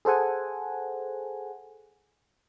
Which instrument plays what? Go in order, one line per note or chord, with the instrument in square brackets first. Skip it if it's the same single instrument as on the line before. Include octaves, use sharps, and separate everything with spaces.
[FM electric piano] G#4 A4 C5 F#5 G#5